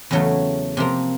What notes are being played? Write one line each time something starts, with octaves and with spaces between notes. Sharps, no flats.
E2 C#3 F#3 A3
C3 F3 A#3